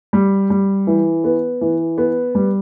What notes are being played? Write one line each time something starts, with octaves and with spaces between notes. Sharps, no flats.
G3
G3
E3
B3
E3
B3
G3